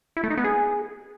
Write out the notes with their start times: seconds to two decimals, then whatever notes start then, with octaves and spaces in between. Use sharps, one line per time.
0.17 E4
0.24 A3
0.30 D#4
0.37 B3
0.44 G#4